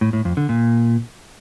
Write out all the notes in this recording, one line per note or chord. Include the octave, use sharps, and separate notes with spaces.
A2
A2
F2
D3
A#2